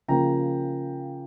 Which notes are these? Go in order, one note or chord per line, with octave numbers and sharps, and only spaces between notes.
C#3 F3 A#3 G5 A#5